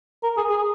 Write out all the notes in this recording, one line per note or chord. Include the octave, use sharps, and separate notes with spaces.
A#4
G#4
G#4